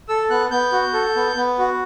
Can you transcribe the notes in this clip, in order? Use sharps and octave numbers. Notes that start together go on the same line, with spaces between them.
A4 E6
B3 F#6
B3 G6
F#4
A4
B3
B3
F#4